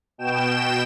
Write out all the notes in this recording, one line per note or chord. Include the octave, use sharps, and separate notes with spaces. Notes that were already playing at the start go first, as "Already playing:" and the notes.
B2 G5 E7